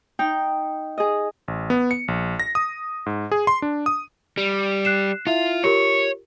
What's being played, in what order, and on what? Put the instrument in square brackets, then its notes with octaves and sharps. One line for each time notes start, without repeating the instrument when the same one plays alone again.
[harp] D#4 G5
G#4 D#5
[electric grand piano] A1
B3
C#7
A#1
A#6
D#6
G#2
G#4
C6
D4
D#6
[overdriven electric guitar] G3
[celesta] F#6 C7 E7
[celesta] E4 E5 [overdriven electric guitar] F4
[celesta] F4 G4 A#4 [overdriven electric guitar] C#5